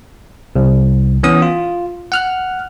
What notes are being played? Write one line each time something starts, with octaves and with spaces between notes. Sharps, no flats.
C2
E3 B3 C#4 D#6
F4
F#5 F6 F#6